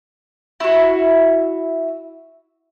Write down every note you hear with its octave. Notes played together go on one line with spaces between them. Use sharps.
E4 F#4